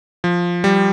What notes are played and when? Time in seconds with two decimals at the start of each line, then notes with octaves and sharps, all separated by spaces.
0.24 F3
0.64 G3